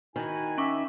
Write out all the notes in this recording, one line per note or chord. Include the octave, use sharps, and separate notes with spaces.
D#3 E4 F#4 G#5
C#4 E5 C#6 D6